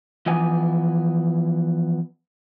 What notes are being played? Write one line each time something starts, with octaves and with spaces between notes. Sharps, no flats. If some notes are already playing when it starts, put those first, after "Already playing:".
E3 F3 B3 D#5 G#5